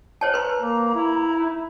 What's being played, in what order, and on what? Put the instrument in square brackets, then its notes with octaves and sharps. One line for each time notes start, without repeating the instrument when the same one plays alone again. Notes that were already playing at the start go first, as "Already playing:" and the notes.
[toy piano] C5 C#5 A5 [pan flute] G#5
[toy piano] B4 C6 [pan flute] A#5
[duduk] A#3
E4
[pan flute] D#4